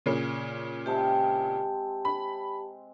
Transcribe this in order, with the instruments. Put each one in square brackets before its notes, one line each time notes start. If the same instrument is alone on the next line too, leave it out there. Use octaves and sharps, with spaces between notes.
[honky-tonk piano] A#2 C#3
[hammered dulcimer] C3 G#3 C4 [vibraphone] G4 A5
[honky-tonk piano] B5